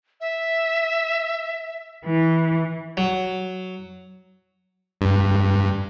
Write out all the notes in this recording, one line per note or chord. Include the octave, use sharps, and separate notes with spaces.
E5
E3
F#3
G2